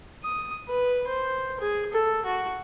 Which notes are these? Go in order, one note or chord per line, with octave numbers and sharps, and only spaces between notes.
D#6
B4
C5
G#4
A4
F#4